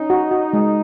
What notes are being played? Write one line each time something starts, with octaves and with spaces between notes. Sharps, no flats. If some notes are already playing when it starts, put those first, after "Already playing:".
Already playing: C#4 D#4
F#4
F#4
G#3